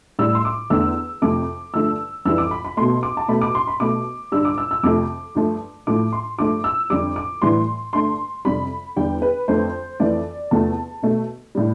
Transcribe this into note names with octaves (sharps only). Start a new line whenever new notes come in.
A2 G3 E6
C6
D6
E2 D3 A3 E6
F2 C3 F3 A3 D6
G2 D3 F3 A3 E6
F2 E3 G3 E6
D6
B5
B5
B2 A3 C6
D6
A5
B2 A3 B5
D6
C6
B5
B2 A3 D6
G2 D3 G3 E6
D6
E6
E6
F2 C3 F3 A3 D6
G2 F3 A3
A2 F3 A3 D6
C6
G2 F3 A3 D6
E6
F2 D3 G3 D6
D6
A2 E3 G3 C6
G2 D3 A3 C6
F2 C3 G3 B5
E2 D3 G3 G5
B4
F2 D3 A3 C5
F2 E3 A3 D5
E2 C3 F3 A3 A5
B2 A3
A2 G3